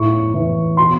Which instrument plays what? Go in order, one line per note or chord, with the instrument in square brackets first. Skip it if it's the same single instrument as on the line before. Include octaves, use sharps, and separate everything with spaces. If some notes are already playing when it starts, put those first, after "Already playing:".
Already playing: [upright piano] A2 C#6
E3
B2 C6